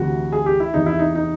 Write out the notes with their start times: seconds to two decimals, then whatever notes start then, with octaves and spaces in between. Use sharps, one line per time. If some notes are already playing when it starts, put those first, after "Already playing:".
Already playing: D2 C3 E3 F#4
0.32 G#4
0.46 G4
0.60 E4
0.74 E2 C3 E3 D#4
0.86 E4
0.99 D#4
1.15 D#4